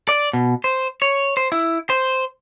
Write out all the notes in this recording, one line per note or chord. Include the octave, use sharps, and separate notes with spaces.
D5
B2
C5
C#5
C5
E4
C5